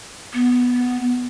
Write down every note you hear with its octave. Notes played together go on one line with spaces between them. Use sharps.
B3